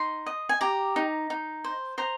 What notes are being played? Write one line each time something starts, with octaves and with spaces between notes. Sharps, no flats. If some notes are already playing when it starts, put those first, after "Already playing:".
Already playing: D#4 C6
D#5
G#5
G4 A#5
D#4
D#4
C5
C5 A#5